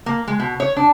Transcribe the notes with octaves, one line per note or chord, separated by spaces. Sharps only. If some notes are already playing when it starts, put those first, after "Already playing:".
A#3
G#3
B2
C#5
D4